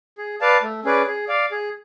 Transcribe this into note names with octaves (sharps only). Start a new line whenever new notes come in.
G#4
B4 D5 F5 A5
A3
C#4 G#4 B4 D5
G#4
D5 F5
G#4